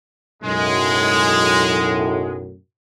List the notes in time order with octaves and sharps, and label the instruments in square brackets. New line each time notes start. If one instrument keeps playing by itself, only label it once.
[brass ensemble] B1 F#2 A2 [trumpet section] G#3